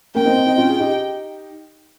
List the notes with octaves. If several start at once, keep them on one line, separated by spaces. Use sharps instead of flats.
A#3 C#4 G5
C4 D#4
C4 D#4
C4 D#4
C#4 F4
G#4
D#4 G4